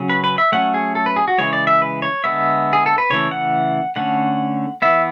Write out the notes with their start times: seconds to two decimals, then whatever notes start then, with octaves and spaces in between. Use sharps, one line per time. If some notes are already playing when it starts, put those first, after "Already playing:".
Already playing: C#3 F#3 C#4
0.10 B4
0.24 B4
0.38 E5
0.52 F#3 A3 C#4 F#5
0.74 G#4
0.95 A4
1.06 B4
1.16 G#4
1.28 F#4
1.38 C#3 E3 G#3 C#5
1.53 D5
1.67 E5
1.82 B4
2.02 C#5
2.24 D3 G#3 B3 E5
2.73 G#4
2.86 A4
2.98 B4
3.10 C#3 E3 A3 C#5
3.31 F#5
3.96 D3 A3 C#4 F#5
4.82 E3 B3 E5